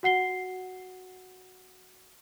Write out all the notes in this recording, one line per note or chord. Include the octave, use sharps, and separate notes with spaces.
F#4 F#5 C7 G7